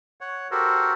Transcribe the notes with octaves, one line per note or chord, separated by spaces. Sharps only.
C#5 F#5
F#4 G4 A4 A#4 C5